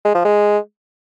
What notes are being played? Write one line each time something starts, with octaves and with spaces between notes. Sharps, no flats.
G#3
F3
G#3